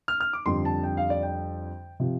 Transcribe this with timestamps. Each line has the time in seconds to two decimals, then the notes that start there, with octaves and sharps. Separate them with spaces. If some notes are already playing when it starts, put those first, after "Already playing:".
0.08 F6
0.20 F6
0.33 D6
0.46 F2 D3 G3 C6
0.65 A5
0.83 G5
0.97 F5
1.10 D5
1.23 G5
2.00 C3 F3